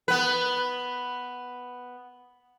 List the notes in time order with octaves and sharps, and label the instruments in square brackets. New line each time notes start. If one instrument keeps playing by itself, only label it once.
[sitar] B3 B4